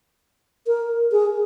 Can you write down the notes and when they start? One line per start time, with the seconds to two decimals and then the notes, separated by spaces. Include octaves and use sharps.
0.67 A#4
1.12 G#4